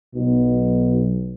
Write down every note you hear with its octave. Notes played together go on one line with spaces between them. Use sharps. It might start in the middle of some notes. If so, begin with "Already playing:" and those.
B1 B2